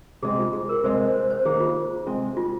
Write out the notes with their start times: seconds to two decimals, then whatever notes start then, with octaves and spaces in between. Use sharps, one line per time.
0.23 C3 G#3 C4 G#4
0.39 F4
0.53 G#4
0.69 A#4
0.84 C3 G#3 C4 C5
1.00 C5
1.15 C5
1.30 C5
1.45 D#3 A#3 G#4
1.60 F4
2.06 C3 G#3 C4
2.37 F4